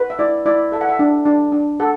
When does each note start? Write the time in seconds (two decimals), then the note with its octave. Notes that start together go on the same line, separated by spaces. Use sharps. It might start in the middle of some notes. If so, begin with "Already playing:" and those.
Already playing: B4
0.10 E5
0.19 E4 D5
0.45 E4 D5
0.72 A4 E5
0.81 F#5
0.89 E5
0.99 D4
1.26 D4
1.52 D4
1.80 A4 F#5